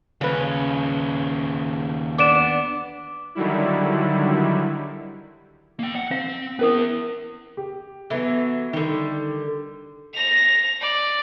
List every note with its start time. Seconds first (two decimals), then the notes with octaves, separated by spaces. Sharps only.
0.21 D#2 C#3 C#4 B4
2.18 B3 D4 D6 D7 E7
3.35 D3 D#3 F#3 G3 E4
5.79 A#3 G5
5.96 F#5
6.11 C4 F5
6.59 B3 C#4 E4 A#4 D#6
7.57 G4
8.10 E3 F#3 B3 A4
8.73 D3 D#3 G3
10.14 A#6 F7
10.81 D5